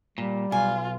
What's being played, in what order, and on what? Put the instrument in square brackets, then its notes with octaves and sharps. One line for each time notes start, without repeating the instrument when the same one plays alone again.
[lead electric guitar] A#2 [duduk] G3
[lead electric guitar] B1 [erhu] F4 [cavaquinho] G#5